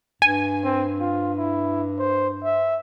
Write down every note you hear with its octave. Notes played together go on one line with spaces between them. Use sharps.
G2 G#5
C4
F4
E4
C5
E5